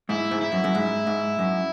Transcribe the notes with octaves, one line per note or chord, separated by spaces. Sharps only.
G#2 E4
G#2
E4
F#2
F#2
G#2
G#2
F#2